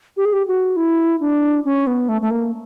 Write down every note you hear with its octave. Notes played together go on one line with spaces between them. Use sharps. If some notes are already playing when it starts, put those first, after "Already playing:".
G4
G#4
G4
F#4
E4
D4
C#4
B3
A3
A3
A#3